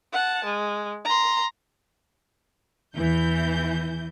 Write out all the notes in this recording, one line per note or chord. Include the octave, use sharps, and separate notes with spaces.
F#5 A5
G#3
A#5 C6
E2 E3 G6